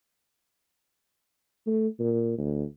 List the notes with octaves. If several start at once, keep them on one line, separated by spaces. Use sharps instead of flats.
A3
A#2
D2